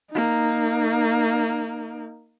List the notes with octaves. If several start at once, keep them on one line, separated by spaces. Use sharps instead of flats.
A#3 D#4